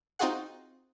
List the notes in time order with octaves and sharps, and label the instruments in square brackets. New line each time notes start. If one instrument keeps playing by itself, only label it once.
[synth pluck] C4 D#4 F4 F#4 G#4 F#5